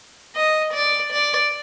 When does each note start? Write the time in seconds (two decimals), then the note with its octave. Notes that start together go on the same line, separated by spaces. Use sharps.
0.36 D#5
0.73 D5
1.12 D5